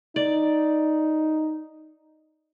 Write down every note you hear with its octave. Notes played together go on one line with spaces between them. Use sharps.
D#4 D5